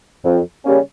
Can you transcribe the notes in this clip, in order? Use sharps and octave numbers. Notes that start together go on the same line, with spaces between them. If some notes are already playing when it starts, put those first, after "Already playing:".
F2
C#3 G3 A#3 C#4